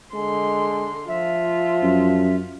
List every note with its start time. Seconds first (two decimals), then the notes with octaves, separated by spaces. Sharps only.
0.14 D3 G#3 C6
1.08 F3 F4 E5
1.82 F#2